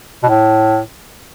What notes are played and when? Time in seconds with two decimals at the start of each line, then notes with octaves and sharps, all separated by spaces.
0.23 B2
0.29 A2